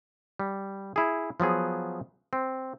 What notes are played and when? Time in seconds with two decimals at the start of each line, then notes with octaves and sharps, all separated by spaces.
0.40 G3
0.96 E4 G#4
1.40 F3 F#3 B3 G#4
2.33 C4